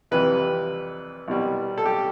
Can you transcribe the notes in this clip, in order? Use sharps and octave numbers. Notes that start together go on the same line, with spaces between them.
F2 C3 E3 G3 B4
C2 B2 G3
A4
G4